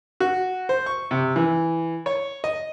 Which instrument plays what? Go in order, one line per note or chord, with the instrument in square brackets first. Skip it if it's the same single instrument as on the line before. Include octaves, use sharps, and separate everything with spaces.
[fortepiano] F#4
C5
C#6
C3
E3
C#5
D#5